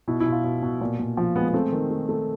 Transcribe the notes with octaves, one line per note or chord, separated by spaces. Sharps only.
B2 E4
E4
B2
F4
B2
B2
A#2
A#2
F3
G#3 B3
B3
A3 C4
D#3
A3
A3